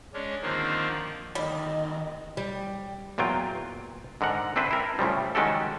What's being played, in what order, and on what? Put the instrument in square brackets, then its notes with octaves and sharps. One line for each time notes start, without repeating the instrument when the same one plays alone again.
[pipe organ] G#3 C#4 D4
D3 D#3 F3 A#3 C4 D4
[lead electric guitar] D2 D#3 [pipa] G3 [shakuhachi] D#5
[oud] G3
[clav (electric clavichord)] E2 A#2 F#3 F4 G5
G#2 D3 A#4 F#5
C4 D4 E4 B4 C5
E4 A#4
A2 C#3 F3 G3
D#3 G#3 C#4 F#4 G4 A4